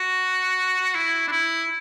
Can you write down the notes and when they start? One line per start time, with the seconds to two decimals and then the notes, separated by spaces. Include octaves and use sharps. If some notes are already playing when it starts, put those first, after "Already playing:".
Already playing: F#4
0.95 E4
1.27 D4
1.31 E4